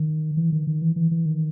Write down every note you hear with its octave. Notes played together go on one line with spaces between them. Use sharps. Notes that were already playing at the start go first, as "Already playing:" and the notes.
Already playing: D#3
E3
D#3
D#3
E3
E3
E3
D#3